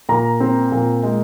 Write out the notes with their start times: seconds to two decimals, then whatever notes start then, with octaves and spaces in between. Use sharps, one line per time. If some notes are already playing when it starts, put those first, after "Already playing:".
0.09 A#2 A#5
0.40 C4
0.72 A#2
1.03 G#3